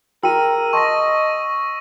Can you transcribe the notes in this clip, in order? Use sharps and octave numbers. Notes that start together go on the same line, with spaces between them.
F#4 G#4 A#4 G5 E6 D#7
D#5 A5 C6 C#6 A#6